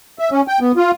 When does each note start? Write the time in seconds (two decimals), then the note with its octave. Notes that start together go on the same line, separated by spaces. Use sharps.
0.19 E5
0.31 C#4
0.48 G5
0.61 B3
0.77 F4